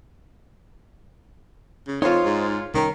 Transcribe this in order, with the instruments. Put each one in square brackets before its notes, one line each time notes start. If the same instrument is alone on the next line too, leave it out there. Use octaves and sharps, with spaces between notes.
[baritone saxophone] C#3
[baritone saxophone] F2 [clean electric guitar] D#4 C5 [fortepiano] F4 C#5
[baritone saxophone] G#2
[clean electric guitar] C2 C#4 A#4 [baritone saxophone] D#3